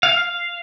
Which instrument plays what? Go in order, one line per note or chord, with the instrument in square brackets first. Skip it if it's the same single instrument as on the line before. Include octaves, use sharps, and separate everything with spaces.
[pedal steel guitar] F5